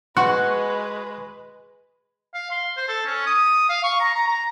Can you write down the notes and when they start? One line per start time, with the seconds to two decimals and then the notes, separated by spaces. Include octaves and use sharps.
0.17 G#3 F#4 B4 C6 C#6 F#6
2.34 F5
2.51 C6
2.77 C5
2.89 A4
3.06 C#4
3.27 D#6
3.69 F5
3.84 C#6
4.00 A#5
4.15 A#5
4.27 A#5